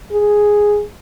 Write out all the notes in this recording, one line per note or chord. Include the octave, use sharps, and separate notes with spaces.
G#4